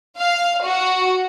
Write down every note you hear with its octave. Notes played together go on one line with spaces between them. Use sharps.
F5
F#4